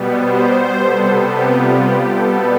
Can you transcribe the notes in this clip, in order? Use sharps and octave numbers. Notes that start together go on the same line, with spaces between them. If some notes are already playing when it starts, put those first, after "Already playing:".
Already playing: B2 G3 B3
C5
C3 G3 B3 A4
G4
F4
G4
B2 G3 B3 A4